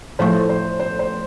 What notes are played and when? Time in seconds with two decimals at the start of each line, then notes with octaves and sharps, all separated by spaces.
0.19 A2 F3 A3 C5
0.49 C5
0.80 C5
0.99 C5